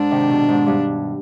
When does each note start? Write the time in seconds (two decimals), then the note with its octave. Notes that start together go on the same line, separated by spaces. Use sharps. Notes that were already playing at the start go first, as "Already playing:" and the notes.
Already playing: G#2 D4
0.11 C3 D#3
0.29 B2
0.49 G#2
0.66 G2